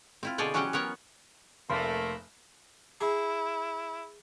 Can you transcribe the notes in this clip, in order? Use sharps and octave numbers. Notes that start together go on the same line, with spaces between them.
C4 E4 F4
B2 D3 G#4 C#5 D5 G5
E3 F#3 C#4 G4 F#5 G5
B3 A#4 C#5 F#5
F1 A3 A#3 C6
E4 G#4